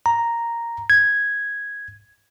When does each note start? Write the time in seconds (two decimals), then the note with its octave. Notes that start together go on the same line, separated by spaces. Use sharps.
0.06 A#5
0.90 G#6